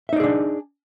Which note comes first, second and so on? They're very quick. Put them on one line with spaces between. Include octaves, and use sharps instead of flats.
E5 D#4 D5 G#4 D4